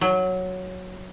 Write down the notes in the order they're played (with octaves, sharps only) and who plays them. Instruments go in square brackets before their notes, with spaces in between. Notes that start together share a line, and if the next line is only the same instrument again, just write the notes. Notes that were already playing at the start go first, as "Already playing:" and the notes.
[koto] F#3